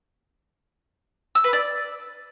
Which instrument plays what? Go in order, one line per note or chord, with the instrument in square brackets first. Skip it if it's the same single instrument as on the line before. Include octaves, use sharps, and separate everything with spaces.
[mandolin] E6
B4
D5